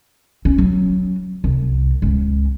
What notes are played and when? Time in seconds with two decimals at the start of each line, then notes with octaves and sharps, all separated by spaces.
0.45 C#4
0.58 F#3
1.44 C2
2.02 C#2